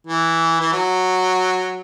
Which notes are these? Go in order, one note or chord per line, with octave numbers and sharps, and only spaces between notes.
E3
E3
F#3